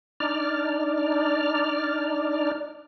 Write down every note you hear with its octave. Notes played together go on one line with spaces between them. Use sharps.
D4 D#4 D5 F6